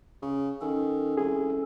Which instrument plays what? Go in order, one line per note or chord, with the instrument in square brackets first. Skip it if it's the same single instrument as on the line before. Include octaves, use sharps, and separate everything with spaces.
[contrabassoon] C#3
[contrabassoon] D#3 [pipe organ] C#4 A4
[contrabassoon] C2 [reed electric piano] G#4